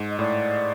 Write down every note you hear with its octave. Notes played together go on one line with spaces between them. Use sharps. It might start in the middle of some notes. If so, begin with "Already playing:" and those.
Already playing: G#2
D#5
A2 D5